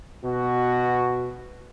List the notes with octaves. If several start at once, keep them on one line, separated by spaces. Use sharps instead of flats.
B2 F#4